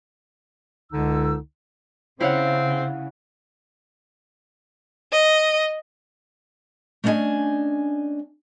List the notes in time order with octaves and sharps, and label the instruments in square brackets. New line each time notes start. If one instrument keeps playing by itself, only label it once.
[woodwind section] C#2 D3 D#4 E6
[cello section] C#3 [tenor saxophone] C4 [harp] E4 F5 F#5 [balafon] C5 C#5
[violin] D#5
[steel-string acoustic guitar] A3 C#4 D4 E4 D#5 G#5